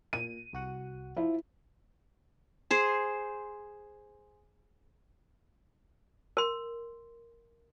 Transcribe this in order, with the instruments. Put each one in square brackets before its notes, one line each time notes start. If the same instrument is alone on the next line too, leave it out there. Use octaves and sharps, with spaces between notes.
[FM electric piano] A#2 [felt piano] D#7
[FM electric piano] C2 F#4 F#5
[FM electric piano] F3 [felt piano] E4
[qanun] G#4 C5
[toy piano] A#4 C6